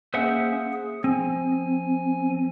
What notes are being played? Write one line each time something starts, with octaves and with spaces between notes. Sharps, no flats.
A#3 C#4 G#4 C5 E5 F#5
G#4
F3 C4 G#5